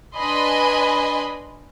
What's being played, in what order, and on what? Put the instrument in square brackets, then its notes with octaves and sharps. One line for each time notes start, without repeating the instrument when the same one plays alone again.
[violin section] D4 B4 D#5 G#5 B5 C6